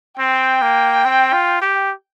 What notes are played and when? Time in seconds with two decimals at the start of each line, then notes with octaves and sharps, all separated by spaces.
0.19 C4 G5
0.62 A#3
1.05 C4
1.33 F4
1.62 G4